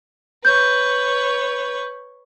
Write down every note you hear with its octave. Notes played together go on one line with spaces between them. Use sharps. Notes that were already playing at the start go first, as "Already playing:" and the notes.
B4 C#5 G6